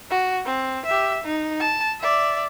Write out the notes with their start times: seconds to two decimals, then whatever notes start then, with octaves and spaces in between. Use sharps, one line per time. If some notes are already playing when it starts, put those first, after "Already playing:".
0.11 F#4
0.46 C4
0.86 G4 E5
1.24 D#4
1.60 A5
2.00 D5 E5